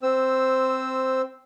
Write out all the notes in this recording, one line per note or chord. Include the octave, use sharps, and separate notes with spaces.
C4 C5 E6